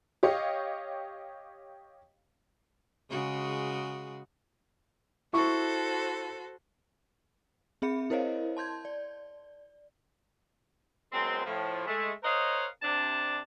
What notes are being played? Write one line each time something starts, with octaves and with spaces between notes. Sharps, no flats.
G4 C#5 D#5 F5
C#3 G#3 F#4
E4 F#4 A4 C5 C#6
C4 G#4 E5 B5 C#7
E4 A#4 C5 C#5 D#5 F5
A5 C6 G6 G#6
D5
F#2 G#3 B3 C4
A2 F3
G#3 A3
A#4 C5 C#5 D#5 F5 F#5
C3 D4 A5